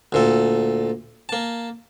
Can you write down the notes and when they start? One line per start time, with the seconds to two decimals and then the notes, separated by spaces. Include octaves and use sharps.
0.12 D2 A#2 A4
1.29 A#3 A5